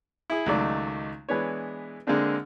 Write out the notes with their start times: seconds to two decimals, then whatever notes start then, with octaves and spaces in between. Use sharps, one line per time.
0.30 E4 G#4
0.46 C#2 D#3 F#3 A3 D5
1.29 E3 G#3 B3 D4 C#5
2.07 D3 G#3 A#3 C4 D4